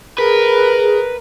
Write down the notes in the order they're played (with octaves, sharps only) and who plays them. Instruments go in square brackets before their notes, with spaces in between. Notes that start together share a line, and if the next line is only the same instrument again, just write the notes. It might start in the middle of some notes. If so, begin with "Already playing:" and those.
[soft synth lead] G#4 [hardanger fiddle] A#4 [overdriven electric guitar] B4